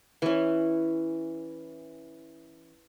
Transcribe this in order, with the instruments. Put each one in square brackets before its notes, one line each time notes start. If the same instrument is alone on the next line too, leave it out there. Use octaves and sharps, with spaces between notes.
[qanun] E3 C#4